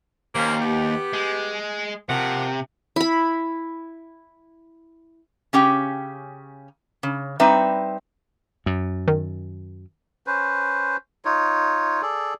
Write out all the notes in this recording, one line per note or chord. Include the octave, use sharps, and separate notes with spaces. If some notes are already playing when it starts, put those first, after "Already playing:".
D#2 A#3 C#4 C5
B3 G4
G#3
C3 F3 A#3 F#5
E4 B5
C#3 C#4 G4 G5
C#3
G3 C4 D#4 B4 E5
F#2
D#3
C#4 B4 C5
D#4 F4 C#5
G#4 A4 D5